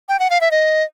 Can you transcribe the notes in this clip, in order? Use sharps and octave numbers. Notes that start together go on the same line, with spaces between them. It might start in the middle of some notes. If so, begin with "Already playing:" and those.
G5
F#5
F5
E5
D#5